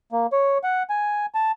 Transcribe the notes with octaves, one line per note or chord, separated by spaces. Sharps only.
A#3
C#5
F#5
G#5
A5